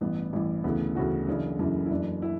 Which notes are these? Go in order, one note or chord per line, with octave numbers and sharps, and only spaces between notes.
A1 G2 E3 B3
A1 G2 E3
D2 C#3 E3 B3
D2 C#3 E3 F#4
F#1 F#2 C#3 E3 D4
F#1 F#2 C#3 E3 E4
E4
F#1 F#2 E3 D4
E3 E4